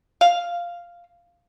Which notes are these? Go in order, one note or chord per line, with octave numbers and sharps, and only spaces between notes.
F5